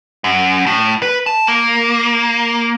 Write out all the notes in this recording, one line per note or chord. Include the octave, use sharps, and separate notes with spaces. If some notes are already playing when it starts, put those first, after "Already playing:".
F#2
A2
B4
A5
A#3